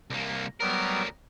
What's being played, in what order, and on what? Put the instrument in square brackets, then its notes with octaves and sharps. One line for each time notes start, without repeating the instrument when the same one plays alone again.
[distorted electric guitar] C2 A#3
[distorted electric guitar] D2 A#4 [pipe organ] F#3 G3 B3